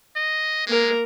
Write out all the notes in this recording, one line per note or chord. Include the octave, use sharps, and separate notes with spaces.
D#5
G#3 A#3 A#4